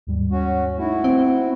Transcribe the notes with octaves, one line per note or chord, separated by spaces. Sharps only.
D#2 G#2 G3
C#4 F#4
A3 D#4 E4 F#4
C4